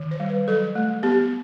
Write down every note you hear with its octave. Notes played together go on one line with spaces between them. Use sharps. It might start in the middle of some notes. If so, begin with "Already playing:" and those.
Already playing: D#3
C5
G3
B4
F#3 A4
A3
B3 G4